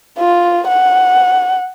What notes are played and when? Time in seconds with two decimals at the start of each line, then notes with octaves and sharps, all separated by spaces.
0.19 F4
0.68 F#5